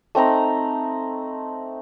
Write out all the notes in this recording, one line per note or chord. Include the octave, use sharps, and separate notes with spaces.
A3 C4 D#4 A#5